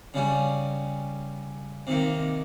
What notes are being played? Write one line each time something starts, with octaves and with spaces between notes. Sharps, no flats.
C#3 G3 C#4
C3 D#3 A#3